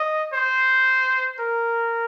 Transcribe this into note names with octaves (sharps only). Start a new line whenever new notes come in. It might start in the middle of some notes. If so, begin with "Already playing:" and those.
Already playing: D#5
C5
A#4